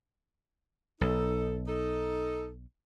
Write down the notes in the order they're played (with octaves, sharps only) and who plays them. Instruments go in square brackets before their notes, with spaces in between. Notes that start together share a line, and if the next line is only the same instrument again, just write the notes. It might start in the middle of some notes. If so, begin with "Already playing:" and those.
[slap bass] B1 [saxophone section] D#4 A4
[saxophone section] D#4 A4